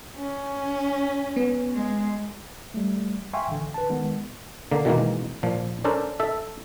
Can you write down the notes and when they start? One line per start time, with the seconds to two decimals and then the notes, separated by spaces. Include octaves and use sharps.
0.18 C#4
1.36 B3
1.73 G#3
2.74 G3 A3
3.33 E5 F5 G5 G#5 C6 C#6
3.47 A1 D3
3.74 B4 A5
3.90 D#3 G#3 B3
4.71 D3 A#3
4.85 B2 D#3 E3 G#3 A#3
5.43 A#2 F3
5.84 C#4 D4 A4 A#4 C5
6.20 A4 E5